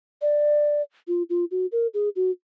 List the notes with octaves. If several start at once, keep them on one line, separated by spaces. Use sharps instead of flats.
D5
F4
F4
F#4
A#4
G#4
F#4